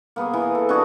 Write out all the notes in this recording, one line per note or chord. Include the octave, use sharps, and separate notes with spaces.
A#3 B3 G#4
E3
A4
D4 F#4 G#4